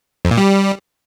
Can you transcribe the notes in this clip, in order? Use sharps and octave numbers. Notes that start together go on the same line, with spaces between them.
F2
A#2
G3